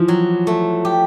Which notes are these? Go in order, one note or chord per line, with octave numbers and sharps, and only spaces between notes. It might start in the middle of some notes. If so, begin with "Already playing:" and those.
Already playing: E3 F3
F#3
A3
G4